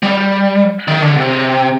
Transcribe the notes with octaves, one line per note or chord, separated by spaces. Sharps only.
G3
D#3
D3
C3